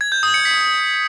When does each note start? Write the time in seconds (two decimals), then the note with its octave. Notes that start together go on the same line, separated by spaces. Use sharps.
0.01 G#6
0.12 G6
0.23 D#6
0.34 C#7
0.45 B6